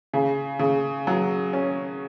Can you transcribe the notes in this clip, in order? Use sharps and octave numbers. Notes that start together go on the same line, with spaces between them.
C#3
C#3
F#3
C#4